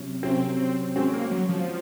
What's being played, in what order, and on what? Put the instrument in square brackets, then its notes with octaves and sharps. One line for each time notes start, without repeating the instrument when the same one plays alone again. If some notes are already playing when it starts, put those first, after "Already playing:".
Already playing: [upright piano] C3 F#3 C#4
[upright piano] C3 F#3 C#4 [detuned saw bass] C4
[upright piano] G#3 C#4 F#4 [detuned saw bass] C4
[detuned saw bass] A#3
F#3
F3